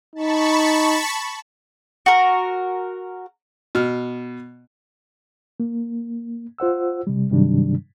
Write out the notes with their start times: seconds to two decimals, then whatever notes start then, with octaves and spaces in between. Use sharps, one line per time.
0.15 D#4 A5 B5 C#6
2.06 F#4 A#4
3.75 B2 F6
5.60 A#3
6.58 F4 C5 F#5 E6
7.07 C3 G3
7.31 G2 C3 D#3 F#3 G3 D4